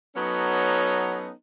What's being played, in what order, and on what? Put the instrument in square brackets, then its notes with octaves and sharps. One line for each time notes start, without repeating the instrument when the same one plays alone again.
[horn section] F#3 B3 C#4 D#4 A4